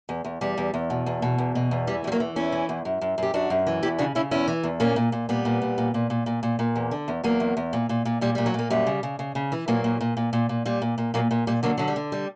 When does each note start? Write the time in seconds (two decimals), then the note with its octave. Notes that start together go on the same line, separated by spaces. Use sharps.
0.09 E2
0.25 E2
0.41 E2 G3
0.58 E2
0.74 E2
0.90 B2
1.06 E2
1.22 B2
1.38 E2
1.55 B2
1.71 E2
1.87 E3 G3
2.04 E2 G3
2.12 F#3 A#3
2.20 E3
2.36 E2 C#4 E4
2.52 E3
2.69 E2
2.85 F#2
3.01 F#2
3.18 F#2 G4
3.34 F#2 D4 F#4
3.50 F#2
3.66 E3
3.82 E2 E4 G4
3.98 C#3 D4 F#4
4.15 C#3 C#4 E4
4.31 E2 C#4 E4
4.48 E3
4.63 E2
4.80 A#2 A#3 C#4
4.96 A#2
5.12 A#2
5.29 A#2 G3 B3
5.45 A#2
5.62 A#2
5.78 A#2
5.94 A#2
6.10 A#2
6.26 A#2
6.43 A#2
6.59 A#2
6.76 E2
6.91 D3
7.08 E2
7.24 E2 F#3 A#3
7.40 E2
7.57 E2
7.73 A#2
7.89 A#2
8.05 A#2
8.21 A#2 G3
8.35 A#2 G3
8.46 F#3
8.54 A#2 A#3
8.70 F#2 G3
8.87 C#3
9.03 C#3
9.19 C#3
9.35 C#3
9.52 E3
9.68 A#2 F#3 A#3
9.84 A#2
10.01 A#2
10.17 A#2
10.33 A#2
10.49 A#2
10.65 A#2 G3
10.82 A#2
10.98 A#2
11.14 A#2 F#3 A#3
11.31 A#2
11.47 A#2 G3
11.63 D3 F#3 A#3
11.78 D3 F#3
11.88 G3
11.96 D3
12.12 G3